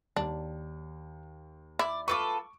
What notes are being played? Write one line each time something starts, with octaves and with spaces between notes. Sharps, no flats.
D#2 D4
E4 D5
F4 A4 B4 C#6 D6